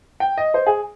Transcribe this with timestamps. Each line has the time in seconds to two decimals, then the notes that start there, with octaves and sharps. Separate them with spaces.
0.20 G5
0.37 D#5
0.54 C5
0.66 G#4